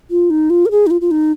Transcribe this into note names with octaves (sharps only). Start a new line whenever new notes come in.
F4
D#4
F4
A#4
G#4
D#4
F4
F4
D#4